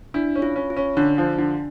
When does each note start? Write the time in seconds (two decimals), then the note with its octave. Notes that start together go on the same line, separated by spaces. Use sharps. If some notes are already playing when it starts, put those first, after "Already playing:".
0.14 D4 E4
0.36 C#4
0.42 F4
0.56 C#4
0.70 F4
0.77 C#4
0.97 D3 D4
1.18 F3
1.38 D3